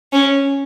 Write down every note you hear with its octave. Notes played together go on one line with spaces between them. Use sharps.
C#4